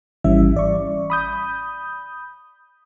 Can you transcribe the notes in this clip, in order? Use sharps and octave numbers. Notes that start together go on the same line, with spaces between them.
G#1 E3 G3 C#4 E5
D5 C#6
B5 D#6 G6